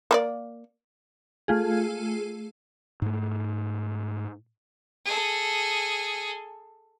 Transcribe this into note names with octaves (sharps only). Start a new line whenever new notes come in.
A#3 B4 D5
A3 F4 G#4
G#2 A3
G#4 A4